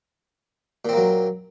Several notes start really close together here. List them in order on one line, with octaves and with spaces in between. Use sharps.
A#2 C4 A#3 F#3